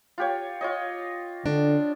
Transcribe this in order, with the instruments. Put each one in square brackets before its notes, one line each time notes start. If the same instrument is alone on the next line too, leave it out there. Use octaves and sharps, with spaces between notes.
[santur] F4 G4 C#5
F4 C#5 D#5
[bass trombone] D3 [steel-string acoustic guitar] D4